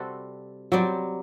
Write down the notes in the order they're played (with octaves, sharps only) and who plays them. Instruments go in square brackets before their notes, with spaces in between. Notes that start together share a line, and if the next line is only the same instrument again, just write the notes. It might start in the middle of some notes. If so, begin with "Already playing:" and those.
Already playing: [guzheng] C3 G3 C4 F#4 A4
[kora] F#3 [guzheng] G3 C4 G4 D5